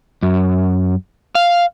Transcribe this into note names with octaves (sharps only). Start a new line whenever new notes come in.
F#2
F5